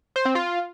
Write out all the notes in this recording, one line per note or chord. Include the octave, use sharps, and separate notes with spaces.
C5
C4
F4